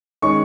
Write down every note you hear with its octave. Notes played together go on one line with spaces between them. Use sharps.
D#3 G#3 C#4 C#6